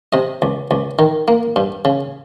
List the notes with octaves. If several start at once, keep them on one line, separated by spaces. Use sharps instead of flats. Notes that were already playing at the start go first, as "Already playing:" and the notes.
C3 D#5
C#2
C#2
D#3
A#3
G2
C#3